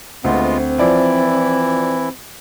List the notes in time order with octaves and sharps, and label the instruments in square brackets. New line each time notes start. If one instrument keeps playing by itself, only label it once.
[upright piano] D2 [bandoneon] G#3 B3 F4 [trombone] C4
[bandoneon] E3 E4 [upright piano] F3 D5